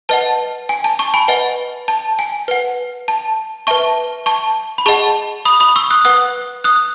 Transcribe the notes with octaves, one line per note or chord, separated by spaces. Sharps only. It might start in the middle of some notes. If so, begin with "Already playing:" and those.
B4 D#5 F#5 A5
G#5
A5
A5 C#6
G#5 B5
B4 D#5 F#5
A5
G#5
B4 F#5
A5
B4 E5 A5 C#6
A5 C#6
B5
G#4 D#5 F#5 A5 C#6
B5 D#6
B5 D#6
C#6 E6
D#6 F#6
B4 F#5 D#6 F#6
D#6 F#6